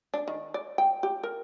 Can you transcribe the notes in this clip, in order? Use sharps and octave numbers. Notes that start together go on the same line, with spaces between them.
D4
D#3
D5
G5
G4
A#4